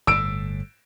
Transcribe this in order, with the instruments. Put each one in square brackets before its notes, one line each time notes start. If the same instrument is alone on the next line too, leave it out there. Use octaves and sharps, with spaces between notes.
[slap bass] G1 A2 [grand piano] E6 D7